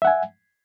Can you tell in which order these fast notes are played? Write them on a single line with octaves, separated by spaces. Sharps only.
E5 F#5 G#5